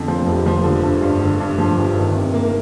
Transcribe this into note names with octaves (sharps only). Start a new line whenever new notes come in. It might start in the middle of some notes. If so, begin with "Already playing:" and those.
Already playing: F2 D3
F3
F1
F3
D3
G2
G2
D3
G2
F3
G1
D#3
C3
A#3